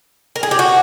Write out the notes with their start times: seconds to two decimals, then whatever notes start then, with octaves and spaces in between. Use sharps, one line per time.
0.36 A#4
0.43 G#4
0.51 G4
0.59 F#4